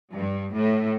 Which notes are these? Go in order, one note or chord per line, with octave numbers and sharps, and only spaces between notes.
G2
A2